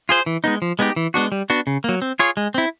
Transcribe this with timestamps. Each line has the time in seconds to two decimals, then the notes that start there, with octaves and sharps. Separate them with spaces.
0.09 F4 G#4 C5
0.26 E3
0.44 G#3 B3 D#4
0.62 F3
0.79 G#3 B3 D#4 G4
0.96 E3
1.14 G#3 B3 D4 F#4
1.32 G3
1.50 B3 D4 F#4
1.67 C#3
1.84 F#3 A#3
2.02 C4
2.19 F4 G#4 C#5
2.37 G#3
2.54 C4 E4